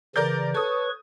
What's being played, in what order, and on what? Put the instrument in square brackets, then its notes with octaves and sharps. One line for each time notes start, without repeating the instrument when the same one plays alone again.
[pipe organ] C#3 E3 [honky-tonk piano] A#4 D5 G6
[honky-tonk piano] A4 D#6 [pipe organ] B4 C#5 C#6